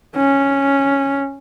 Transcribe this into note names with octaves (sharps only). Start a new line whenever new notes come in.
C#4